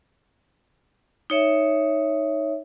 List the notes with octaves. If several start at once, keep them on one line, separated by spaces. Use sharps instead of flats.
D#4 C#5 E5